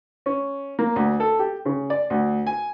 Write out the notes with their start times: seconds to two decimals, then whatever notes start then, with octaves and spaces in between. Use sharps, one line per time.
0.26 C#4
0.79 A#3
0.96 D2
1.20 A4
1.39 G4
1.65 C#3
1.90 D5
2.10 D2
2.47 G#5